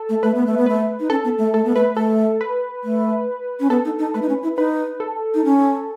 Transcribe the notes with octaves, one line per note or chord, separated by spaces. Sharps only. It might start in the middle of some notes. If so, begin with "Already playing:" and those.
Already playing: A4
A3
A3 B4
B3
A3
B3
A3 B4
D#4
C#4 A4
B3
A3
A3 A4
B3
A3 B4
A3 A4
B4
A3
C#4
B3 A4
D#4
D#4
A3 B4
D#4
C#4
E4
D#4 B4
A4
D#4
C#4